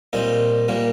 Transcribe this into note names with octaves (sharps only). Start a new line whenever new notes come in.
A#2 G3 C4 D#4
A#2 G3 A#3